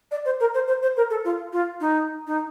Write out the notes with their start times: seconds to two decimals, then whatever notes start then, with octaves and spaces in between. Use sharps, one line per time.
0.11 D5
0.25 C5
0.40 A#4
0.54 C5
0.68 C5
0.82 C5
0.97 A#4
1.10 A4
1.24 F4
1.53 F4
1.80 D#4
2.27 D#4